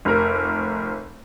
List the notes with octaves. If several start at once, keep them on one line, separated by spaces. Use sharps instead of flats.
F1 A#4